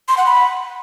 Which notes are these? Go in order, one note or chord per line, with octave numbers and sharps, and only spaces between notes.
C6
F#5
B5